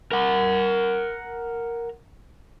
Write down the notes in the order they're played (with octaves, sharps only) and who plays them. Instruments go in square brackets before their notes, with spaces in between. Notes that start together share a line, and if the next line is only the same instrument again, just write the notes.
[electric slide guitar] A#4 F#5